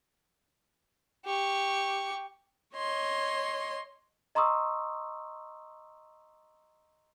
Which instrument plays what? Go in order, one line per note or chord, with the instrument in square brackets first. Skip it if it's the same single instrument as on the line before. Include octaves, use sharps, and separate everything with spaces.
[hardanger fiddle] G4 C#6
[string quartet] C#5 D#5 C6
[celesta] D#5 A#5 C6 C#6 D#6 E6